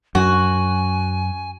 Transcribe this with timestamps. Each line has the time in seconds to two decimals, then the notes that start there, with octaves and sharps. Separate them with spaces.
0.15 F#2 F#4 G#5